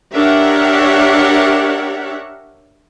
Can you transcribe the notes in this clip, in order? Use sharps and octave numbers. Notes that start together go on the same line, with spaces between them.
D4 G4 A#4 C#5 E5 F#5